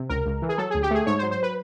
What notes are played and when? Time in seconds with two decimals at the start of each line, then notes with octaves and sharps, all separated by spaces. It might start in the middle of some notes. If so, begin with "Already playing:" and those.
Already playing: C3
0.09 C#2 A#4
0.26 C#2
0.42 E3
0.49 G#4
0.58 F#3 A4
0.70 D2 G#4
0.83 G4
0.91 A3 G#4
1.06 G#2 C#5
1.19 C5
1.23 F#3
1.31 C5
1.43 B4